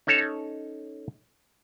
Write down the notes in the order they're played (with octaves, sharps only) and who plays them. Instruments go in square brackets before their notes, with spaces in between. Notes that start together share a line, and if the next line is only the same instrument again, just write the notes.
[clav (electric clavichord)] C#4 D#4 A4 C#5